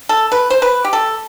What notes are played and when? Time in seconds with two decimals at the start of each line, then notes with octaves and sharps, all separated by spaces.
0.09 A4
0.32 B4
0.50 C5
0.62 B4
0.84 G4
0.93 A4